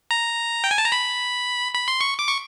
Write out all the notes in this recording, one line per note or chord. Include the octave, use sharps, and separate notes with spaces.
A#5
G5
G#5
A5
A#5
B5
B5
C6
C#6
D6
C#6